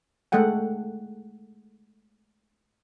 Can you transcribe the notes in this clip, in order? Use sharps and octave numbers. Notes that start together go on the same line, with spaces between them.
G#3 A3 A4 F#5 G5